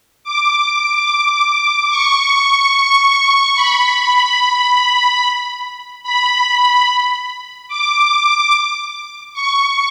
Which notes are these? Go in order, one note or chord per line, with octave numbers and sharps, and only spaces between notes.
D6
C#6
B5
B5
D6
C#6